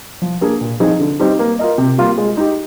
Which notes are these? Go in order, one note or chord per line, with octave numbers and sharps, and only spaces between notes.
F3
A#3 D4 G#4
A#2
F3 C4 D#4 G#4
D3
G3 C4 D#4 G4
A#3
F4 A#4 D#5
C3
G3 A#3 F4
G#3
D#4 G4